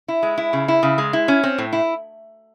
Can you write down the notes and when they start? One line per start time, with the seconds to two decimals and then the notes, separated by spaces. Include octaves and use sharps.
0.08 E4
0.23 G#3
0.38 E4
0.53 C#3
0.68 E4
0.83 C#3
0.98 G#3
1.13 E4
1.28 C#4
1.43 C4
1.58 A2
1.73 E4